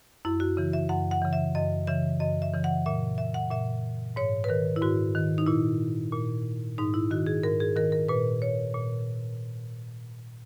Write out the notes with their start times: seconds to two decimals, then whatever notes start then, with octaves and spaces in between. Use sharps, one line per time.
0.25 F#2 E4
0.40 F#4
0.57 C#3 E3
0.73 E5
0.89 F#2 F#5
1.11 F#5
1.22 C#3 E3
1.33 E5
1.55 F#2 D#5
1.87 C#3 E3 E5
2.20 F#2 D#5
2.42 E5
2.54 C#3 E3
2.64 F#5
2.86 A#2 E5
3.18 E5
3.34 F#5
3.51 A#2 E5
4.16 G#2 C#5
4.44 B4
4.49 D#3 A#4
4.76 E4
4.82 G#2 F#4
5.15 D#3
5.38 D#4
5.47 A#2 E4
6.12 A#2
6.78 G#2 D#4
6.94 E4
7.11 D#3 F#4
7.26 G#4
7.43 G#2 A#4
7.60 G#4
7.76 D#3 A#4
7.92 A#4
8.09 A#2 B4
8.42 C#5
8.74 A#2